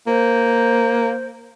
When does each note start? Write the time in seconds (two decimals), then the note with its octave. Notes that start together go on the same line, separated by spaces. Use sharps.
0.07 A#3 C5